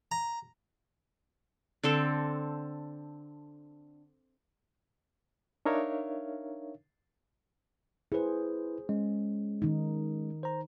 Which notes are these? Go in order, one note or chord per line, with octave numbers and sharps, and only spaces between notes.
A#5
D3 C4 A4
D4 D#4 A#4 C#5 E5 F5
E4 G#4 B4 C5
G#3 C#4
D#3 D#4
C5 A#5